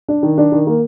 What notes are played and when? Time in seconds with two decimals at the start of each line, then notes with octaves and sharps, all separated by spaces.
0.09 D4
0.23 D#3
0.38 D4
0.52 D#3
0.67 A#3